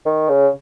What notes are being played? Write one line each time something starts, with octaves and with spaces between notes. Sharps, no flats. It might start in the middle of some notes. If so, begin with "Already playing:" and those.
D#3
C#3